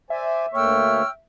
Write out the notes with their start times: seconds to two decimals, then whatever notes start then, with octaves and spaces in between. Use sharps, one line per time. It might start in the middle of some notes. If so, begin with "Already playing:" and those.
0.10 C5 D5 E5 G#5
0.54 D2 A3 A#3 C#5 G5 E6 F6